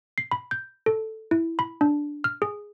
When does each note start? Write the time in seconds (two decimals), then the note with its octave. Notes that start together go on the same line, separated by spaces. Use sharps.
0.18 C7
0.31 B5
0.51 G6
0.86 A4
1.31 E4
1.59 B5
1.81 D4
2.24 F6
2.42 G#4